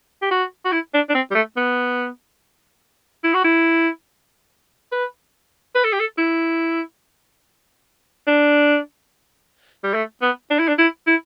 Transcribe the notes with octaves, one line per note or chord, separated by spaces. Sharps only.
G4
F#4
F#4
E4
D4
D4
C4
G3
A3
B3
E4
F#4
E4
B4
B4
A4
G4
A4
E4
D4
G3
A3
B3
D4
E4
D4
E4
E4